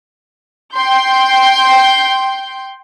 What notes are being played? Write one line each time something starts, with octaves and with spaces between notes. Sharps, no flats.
G5 C6 G6